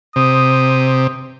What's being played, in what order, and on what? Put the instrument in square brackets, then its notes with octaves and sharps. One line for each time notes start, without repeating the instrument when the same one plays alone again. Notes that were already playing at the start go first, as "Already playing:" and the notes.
[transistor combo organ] C3 [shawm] D#6